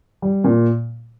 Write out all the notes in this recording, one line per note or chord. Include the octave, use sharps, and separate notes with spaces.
G3
A#2